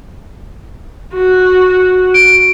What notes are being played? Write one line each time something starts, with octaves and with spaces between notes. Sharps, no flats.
F#4
D7